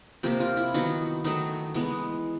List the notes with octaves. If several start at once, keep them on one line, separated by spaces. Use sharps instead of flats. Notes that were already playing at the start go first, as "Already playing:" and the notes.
C3 F3 A#3 G4
F4
E4
D#3 F#3 B3 D#4
D#3 F#3 A3 D#4
E3 G#3 B3